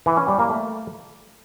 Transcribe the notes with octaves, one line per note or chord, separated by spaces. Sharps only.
E3
C#4
G3
A#3
A3